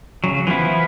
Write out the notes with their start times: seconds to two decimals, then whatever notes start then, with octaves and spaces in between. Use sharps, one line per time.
0.24 C#3 F#3
0.47 E3 F3 B3 E4